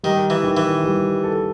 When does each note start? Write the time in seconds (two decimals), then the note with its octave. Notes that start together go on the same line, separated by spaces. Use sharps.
0.03 D#3 G3
0.30 E3
0.44 D#3
0.57 E3
0.84 G3
1.24 A4